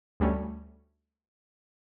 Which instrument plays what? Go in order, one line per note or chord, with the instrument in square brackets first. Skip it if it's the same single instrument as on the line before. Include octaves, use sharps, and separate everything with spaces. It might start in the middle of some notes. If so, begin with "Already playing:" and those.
[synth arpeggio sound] D2 G3 A3 C#4